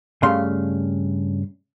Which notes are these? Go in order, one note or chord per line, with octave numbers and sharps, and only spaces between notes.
G2 C#3 A3 F5 C6